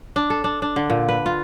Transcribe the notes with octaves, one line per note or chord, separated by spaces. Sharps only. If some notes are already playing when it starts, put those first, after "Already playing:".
D4
A4
D4
D4
D3
A#2
B4
F4